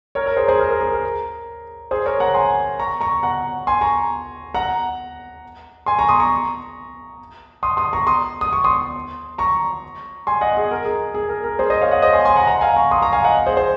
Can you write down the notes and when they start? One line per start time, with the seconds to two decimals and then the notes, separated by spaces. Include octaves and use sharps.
0.15 A#4 C#5
0.26 A#4
0.37 G#4 C5
0.48 G#4 C5
0.59 A#4
0.70 A#4
0.81 G#4
0.93 A#4
1.91 G#4 C5
2.06 A#4 C#5
2.20 F#5 A#5
2.35 G#5 C6
2.79 A#5 C#6
3.01 A#5 C#6
3.23 F#5 A#5
3.67 G#5 C6
3.81 A#5 C#6
4.54 F#5 A#5
5.86 G#5 C6
5.99 A#5 C#6
6.09 C6 D#6
6.20 A#5 C#6
7.63 C6 D#6
7.77 C6 D#6
7.93 A#5 C#6
8.07 C6 D#6
8.41 D#6
8.53 C#6
8.64 C6 D#6
9.38 A#5 C#6
10.27 G#5 C6
10.41 D#5 F#5
10.57 G#4
10.71 A#4
10.85 G#4
11.14 G#4
11.29 A#4
11.44 A#4
11.59 G#4 C5
11.70 C5 D#5
11.81 C#5 F5
11.91 D#5 F#5
12.02 C5 D#5
12.13 G#5 C6
12.25 G#5 C6
12.36 F#5 A#5
12.47 F#5 A#5
12.61 F5 G#5
12.76 A#5 C#6
12.91 C6 D#6
13.02 A#5 C#6
13.13 F5 G#5
13.24 D#5 F#5
13.46 G#4 C5
13.57 G#4 C5